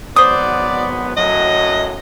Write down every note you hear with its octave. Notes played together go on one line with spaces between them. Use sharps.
G#1 F#3 B3 C5 D5 D#6
F#2 A2 F#3 D#5